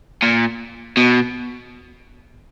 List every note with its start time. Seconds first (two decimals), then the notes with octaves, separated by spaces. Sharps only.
0.22 A#2
0.97 B2